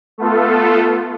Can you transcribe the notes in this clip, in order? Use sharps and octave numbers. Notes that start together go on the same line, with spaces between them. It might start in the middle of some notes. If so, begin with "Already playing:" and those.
A3 B3 F4 A4